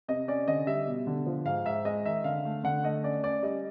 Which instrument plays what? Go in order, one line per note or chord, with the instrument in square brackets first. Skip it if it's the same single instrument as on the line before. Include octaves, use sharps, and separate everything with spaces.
[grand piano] C3 D#5
C#4 D5
D3 D#5
G3 E5
B2
D3
F3
G#2 F5
G#2 E5
G#3 D#5
D#3 E5
D3 F5
A3
D3 F#5
A3 D#5
C#4 D5
C#4 D5
G3 D#5